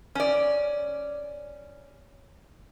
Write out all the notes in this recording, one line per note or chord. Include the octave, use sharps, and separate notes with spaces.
C#4 D5